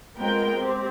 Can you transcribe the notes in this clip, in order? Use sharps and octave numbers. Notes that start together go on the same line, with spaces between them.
G#3 B3 C4 F4 A#4 G5
C4 G4